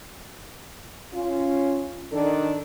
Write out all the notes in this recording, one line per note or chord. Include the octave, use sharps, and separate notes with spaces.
C#4 F4
D#3 D4 A4